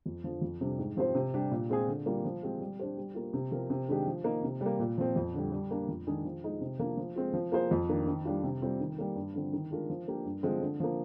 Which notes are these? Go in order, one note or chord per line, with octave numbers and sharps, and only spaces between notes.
F2
D3 F3
F2
C3 G3 D4
G#2
F3 C4 G4 C5
C3
G3 D4 G4
A#2
G#3 C4 F4 G#4
D3
G3 A#3 F4
F3
G#3 C4 G4
G3
D4 G4 C5
G3
A#3 F4
C3
F3 C4 G4 A#4
C3
D#3 G#3 D4 G4
F3
A#3 D#4
C3
G3
A#3
A#2
F3 C4
F2
D3 G3
G3
A#3 D4
F2
D#3 G#3 D4 G#4
F3
G#3 D#4
C3
F3 A#3 D4
F3
G#3 C4 F4
F3
A#3 F4 G#4 C5
F2
D#3 A#3 D4
D#3
G3 D4 F4
C3
G3 C4 F4
D#3
G3 A#3
G2
D3 F3 C4
D#3
G#3 D4 F4 A#4
F3
A#3 D4 G4 A#4
G2
D3 F3 G#3 C4
D3
F3 A#3